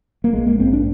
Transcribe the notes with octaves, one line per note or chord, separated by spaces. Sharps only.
A#3
A#1 G#3
A#3
G#2 C4
D4